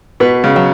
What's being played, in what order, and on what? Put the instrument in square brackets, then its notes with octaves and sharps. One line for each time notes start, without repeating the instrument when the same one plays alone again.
[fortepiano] B2 [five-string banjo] B4
[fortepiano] C#3
[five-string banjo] F#3